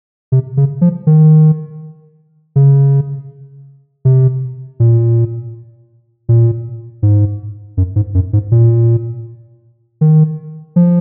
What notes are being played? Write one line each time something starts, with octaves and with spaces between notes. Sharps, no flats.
C3
C#3
F3
D#3
C#3
C3
A#2
A#2
G#2
F#2
G#2
F#2
G#2
A#2
D#3
F3